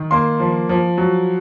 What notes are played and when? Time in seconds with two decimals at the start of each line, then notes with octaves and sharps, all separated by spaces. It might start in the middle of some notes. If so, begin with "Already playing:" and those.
Already playing: D#3
0.11 A#3 C6
0.40 F3
0.69 F3
0.98 F#3